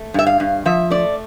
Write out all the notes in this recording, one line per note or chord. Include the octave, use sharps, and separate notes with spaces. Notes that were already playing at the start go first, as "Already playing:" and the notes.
Already playing: A3
G2 E5
F5
G2
F3 E5
A3 D5